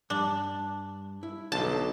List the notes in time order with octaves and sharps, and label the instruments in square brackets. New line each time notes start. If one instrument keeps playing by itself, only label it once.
[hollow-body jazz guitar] G2 [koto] D4
[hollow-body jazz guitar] E4
[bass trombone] B1 [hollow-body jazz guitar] D3 C6 [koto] A5